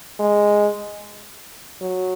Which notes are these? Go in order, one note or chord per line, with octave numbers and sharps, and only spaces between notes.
G#3
F#3